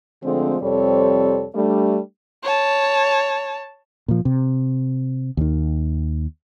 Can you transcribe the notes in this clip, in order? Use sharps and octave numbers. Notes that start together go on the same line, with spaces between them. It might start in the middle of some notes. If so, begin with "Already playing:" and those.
D3 F3 G#3 A3 C4
F2 C3 G3 C4 A4 C#5
G3 A3 D4
C#5 A5
A#2 F3
C3
D#2 D#3